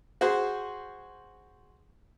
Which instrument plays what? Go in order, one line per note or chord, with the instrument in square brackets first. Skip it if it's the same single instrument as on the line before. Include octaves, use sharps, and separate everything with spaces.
[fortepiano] F#4 G#4 C5